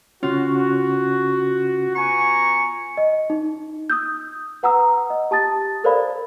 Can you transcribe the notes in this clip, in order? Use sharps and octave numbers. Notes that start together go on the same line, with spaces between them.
C#3 C#4 F4 F#4
B3 G#5 A#5 C#6
D#5
D#4
D#6 E6 G6
B4 F#5 A#5 D#6 E6
D#5
G4 A5 D#6 A6
A4 A#4 C5 D5 F5 B5